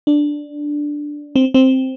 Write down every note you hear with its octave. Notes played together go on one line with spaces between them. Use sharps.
D4
C4
C4